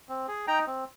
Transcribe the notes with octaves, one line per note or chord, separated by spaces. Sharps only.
C4
G#4
D#4 G5 A#5
C4